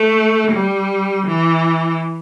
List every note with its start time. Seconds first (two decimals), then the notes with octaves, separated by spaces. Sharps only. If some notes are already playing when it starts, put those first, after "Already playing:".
Already playing: A3
0.52 G3
1.27 E3